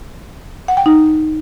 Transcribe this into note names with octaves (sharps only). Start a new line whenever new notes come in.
F#5
G5
D#4